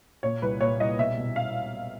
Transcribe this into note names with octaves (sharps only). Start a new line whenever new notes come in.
A#2 C#5
C2 B4
A#2 C#5
C2 D#5
B2 E5
B2
F5